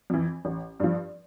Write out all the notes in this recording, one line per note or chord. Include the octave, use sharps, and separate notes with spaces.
F2 E3
A1
G2 F3